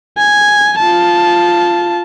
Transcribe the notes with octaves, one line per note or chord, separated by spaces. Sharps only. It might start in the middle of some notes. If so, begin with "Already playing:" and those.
G#5
F4 A5